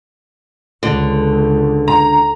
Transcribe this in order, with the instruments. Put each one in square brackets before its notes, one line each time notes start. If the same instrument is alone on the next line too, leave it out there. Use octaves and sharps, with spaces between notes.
[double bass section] C#2 [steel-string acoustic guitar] D3
[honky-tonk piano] A#5